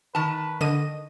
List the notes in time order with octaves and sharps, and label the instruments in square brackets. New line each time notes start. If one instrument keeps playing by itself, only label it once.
[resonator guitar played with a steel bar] D#3 A5 [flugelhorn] B4
[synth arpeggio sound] D3 D#7 [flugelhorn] D#5